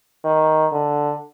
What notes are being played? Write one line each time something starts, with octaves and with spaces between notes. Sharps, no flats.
D#3
D3